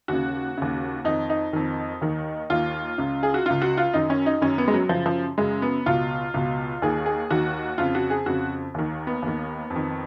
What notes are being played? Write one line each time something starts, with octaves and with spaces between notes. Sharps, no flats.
D#2 C#3 F#4
D#2 C#3
F2 D#3 D#4
D#4
F2 D#3
D#2 D#3
D#2 D#3 F4
C#2 C#3
G#4
F#4
C#2 C#3 F4
F#4
F4
F#2 D#3 D#4
C#4
D#4
F#2 D#3 C#4
B3
G#3
F#3
F#2 C#3 F3
F3
F#2 C#3 G#3
B3
C#2 B2 F4
C#2 B2
D#2 D#3 G#4
G#4
D#2 D#3 F#4
F2 C#3 F4
F#4
G#4
F2 C#3 F#4
D#2 D#3
B3
D#2 D#3
F2
D#3